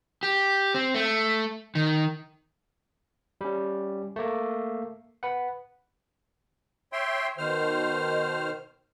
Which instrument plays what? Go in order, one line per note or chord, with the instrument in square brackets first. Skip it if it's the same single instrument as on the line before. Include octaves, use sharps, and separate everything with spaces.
[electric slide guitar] G4
C4
A3
D#3
[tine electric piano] G3 C#4
A3 A#3
B4 F#5
[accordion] C#5 E5 G5 C6
B2 D#3 C5 F6